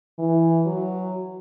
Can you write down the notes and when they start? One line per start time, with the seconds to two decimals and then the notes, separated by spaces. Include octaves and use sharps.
0.19 E3
0.66 F#3